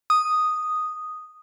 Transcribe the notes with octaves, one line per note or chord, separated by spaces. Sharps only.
D#6